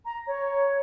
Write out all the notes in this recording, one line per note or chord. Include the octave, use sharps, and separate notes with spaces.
A#5
C#5